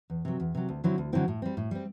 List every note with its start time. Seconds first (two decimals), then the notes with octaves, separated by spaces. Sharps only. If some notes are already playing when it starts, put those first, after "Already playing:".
0.10 E2
0.25 C3 F#3
0.40 E2
0.55 C3 F#3
0.69 D2
0.84 D3 F#3 C4 E4
0.98 D2
1.13 D3 F#3 C4 E4
1.28 A2
1.42 G3 C4
1.57 A2
1.71 G3 C4